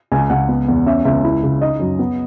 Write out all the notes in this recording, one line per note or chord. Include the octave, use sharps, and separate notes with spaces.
C#2 G#5
C#2 F#5
B3
E2
C#4 E5
C#2 E5
E4
C#3
D#4 D#5
F#2
B3